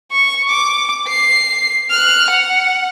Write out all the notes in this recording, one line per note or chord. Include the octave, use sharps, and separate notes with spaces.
C#6
D6
C7
F6 F#6
F#5